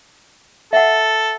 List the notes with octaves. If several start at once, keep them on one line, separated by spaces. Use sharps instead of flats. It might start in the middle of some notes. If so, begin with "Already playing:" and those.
A4 E5 F#5